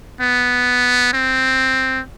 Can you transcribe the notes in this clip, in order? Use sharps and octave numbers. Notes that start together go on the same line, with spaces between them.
B3
C4